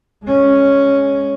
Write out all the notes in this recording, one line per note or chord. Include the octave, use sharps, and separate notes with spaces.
G#3 C#4